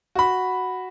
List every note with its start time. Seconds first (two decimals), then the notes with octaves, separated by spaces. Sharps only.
0.15 F#4 B5